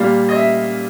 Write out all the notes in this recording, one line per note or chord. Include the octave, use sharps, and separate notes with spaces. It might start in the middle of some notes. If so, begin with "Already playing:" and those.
Already playing: A#2 G3 F5
D#5
E5